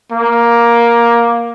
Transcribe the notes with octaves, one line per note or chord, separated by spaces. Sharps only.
A#3